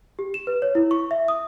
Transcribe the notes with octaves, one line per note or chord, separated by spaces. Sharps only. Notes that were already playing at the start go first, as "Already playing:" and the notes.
G4
E7
B4
C#5
E4
C#6
E5
D#6